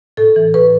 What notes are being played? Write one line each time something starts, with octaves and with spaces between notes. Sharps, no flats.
A2 A4
E3
A2 B4